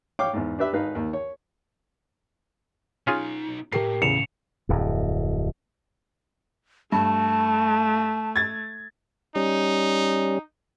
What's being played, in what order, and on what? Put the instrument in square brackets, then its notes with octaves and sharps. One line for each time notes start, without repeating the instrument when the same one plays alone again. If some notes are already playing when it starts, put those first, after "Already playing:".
[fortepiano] C#5 F5 G5 D6
E2 G#2
D4 G4 B4 E5
G#1 D#4 B4 F5
D#2
C#5
[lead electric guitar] B1 D#4 [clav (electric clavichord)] C#4 F4 G#4
[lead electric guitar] A2 [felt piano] G4 A#4 C7
[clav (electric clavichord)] E2 [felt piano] C#3 [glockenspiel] C#7 E7 F7
[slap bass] D1 F2
[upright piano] G2 [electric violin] A3 [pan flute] A5
[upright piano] G#6 A6
[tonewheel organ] G3 C#4 [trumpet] D#4